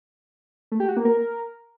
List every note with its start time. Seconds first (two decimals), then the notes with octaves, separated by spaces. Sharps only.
0.72 A3
0.80 G4
0.88 F#4
0.97 A#3
1.05 A#4